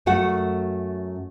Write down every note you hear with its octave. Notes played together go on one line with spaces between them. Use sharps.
F#2 A3 F#4 F#5